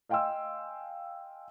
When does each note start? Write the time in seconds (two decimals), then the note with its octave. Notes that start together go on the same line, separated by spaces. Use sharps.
0.09 D#5 F5 G5 G#5 C6 E6